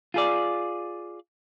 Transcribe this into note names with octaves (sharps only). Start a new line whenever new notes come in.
F4 G#4 D5